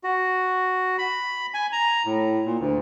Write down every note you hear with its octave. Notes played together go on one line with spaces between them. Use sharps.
F#4
B5
G#5
A#5
A2
A#2
D2